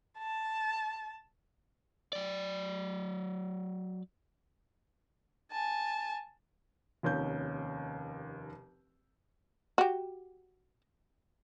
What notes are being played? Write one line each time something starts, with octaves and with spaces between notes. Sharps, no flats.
A5
F#3 D5
G#5 A5
F1 D#2 C#4 G6
F#4 G4